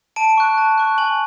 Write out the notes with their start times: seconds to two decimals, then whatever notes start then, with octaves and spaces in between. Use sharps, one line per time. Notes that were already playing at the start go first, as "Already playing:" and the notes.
0.16 A5 D7
0.37 C#6 F#6
0.58 A5
0.78 C#6 F#6
0.98 G#5 F#7